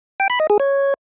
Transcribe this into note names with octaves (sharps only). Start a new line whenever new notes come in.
G5
B5
D#5
G#4
C#5